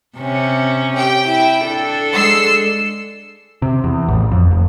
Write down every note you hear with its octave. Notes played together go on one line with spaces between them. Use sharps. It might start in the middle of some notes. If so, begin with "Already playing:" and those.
C3 C#4
G4 G5
E4
D4 A4
G#3 E6 C7
C3
E2
A1
F2
F1